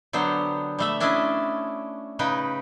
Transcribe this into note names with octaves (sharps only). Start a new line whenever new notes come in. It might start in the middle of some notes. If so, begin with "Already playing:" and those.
D3 F#3 B3 G4 C5
G3 A3 E5
C#4 D4 E4 D5 D#5
C#3 D#4 B4 G5